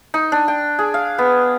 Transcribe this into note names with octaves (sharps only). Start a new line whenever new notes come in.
D#4
D4
G5
G#4
F5
B3